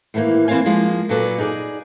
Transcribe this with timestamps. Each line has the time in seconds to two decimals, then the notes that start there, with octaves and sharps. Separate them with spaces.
0.14 A2 D#3 E3 A3 A#3
0.48 E3 A#3 C4 C5 F5 G#5
0.66 F3 G#3 A#3
1.09 A#2 F#3 A4 B4 D5
1.38 D#4 G#4 D5